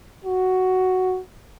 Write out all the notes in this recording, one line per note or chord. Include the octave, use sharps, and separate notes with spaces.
F#4